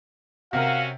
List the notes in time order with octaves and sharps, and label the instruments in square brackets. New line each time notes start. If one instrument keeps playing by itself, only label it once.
[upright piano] C3 A#4 [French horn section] C#4 F#4 [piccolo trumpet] F5